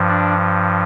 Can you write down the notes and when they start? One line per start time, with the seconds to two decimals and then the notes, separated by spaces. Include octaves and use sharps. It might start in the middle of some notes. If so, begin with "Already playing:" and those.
Already playing: G2 F3
0.08 D4